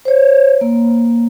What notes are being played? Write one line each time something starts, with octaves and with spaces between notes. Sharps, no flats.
C5 C#5
A#3